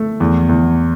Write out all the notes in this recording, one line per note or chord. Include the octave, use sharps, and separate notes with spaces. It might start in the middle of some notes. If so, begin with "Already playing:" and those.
Already playing: A3
E2
E2